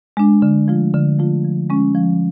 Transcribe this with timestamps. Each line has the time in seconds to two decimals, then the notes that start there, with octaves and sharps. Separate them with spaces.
0.17 G#3 D4
0.42 D3
0.68 F3 A3 F4
0.94 D3
1.19 F3 A3 F4
1.44 F3
1.70 G#3 C#4
1.95 F3